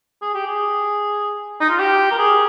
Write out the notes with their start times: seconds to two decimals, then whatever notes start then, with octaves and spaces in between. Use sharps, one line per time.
0.22 G#4
0.34 G4
0.47 G#4
1.60 D#4
1.69 F4
1.79 G4
2.11 A#4
2.18 G#4